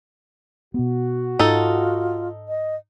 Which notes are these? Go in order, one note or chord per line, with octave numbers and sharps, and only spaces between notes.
B2 B3 F#4
G#2 D#4 F4 A4
D#5